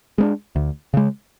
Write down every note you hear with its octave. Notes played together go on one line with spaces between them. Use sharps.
G#3 B3 D4
D2
C#3 G#3